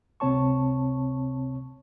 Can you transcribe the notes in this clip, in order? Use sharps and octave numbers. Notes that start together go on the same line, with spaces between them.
C#2 C3 C4 C#5 A5 C#6